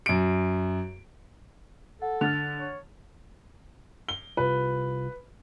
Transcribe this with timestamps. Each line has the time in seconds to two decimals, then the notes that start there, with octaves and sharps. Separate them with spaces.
0.06 F#2 D7
2.02 A4 F#5
2.21 D3 F6 A6 F7
2.58 C#5
4.09 G7
4.37 C2 F4 B4